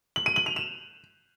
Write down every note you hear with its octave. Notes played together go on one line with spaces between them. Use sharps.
F#7
D#7
F#7
F7
E7